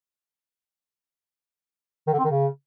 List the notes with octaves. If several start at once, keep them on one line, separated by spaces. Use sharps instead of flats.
D#3
D3
C4
D#3
C#3